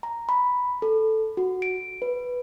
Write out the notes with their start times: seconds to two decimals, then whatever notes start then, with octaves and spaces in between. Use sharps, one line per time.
0.03 A#5
0.29 B5
0.82 A4
1.37 F#4
1.62 D7
2.02 B4